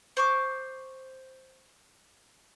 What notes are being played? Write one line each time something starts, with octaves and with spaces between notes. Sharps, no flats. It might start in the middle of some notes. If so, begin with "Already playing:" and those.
C5 C#6 D6